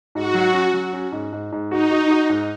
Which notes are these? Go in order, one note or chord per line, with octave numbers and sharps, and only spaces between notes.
G#2 F#4
F#3
C#4
F#3
C#4
G#2
G#2
G#2
D#4 F#4
F#4
F#4
G#2